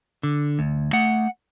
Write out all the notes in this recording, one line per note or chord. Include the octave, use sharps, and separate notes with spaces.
D3
D2
A3 F#5